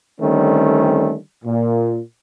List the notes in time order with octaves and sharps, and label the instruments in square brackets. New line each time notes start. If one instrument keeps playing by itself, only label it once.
[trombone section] D3 D#3 G3 A3 C4 C#4
A#2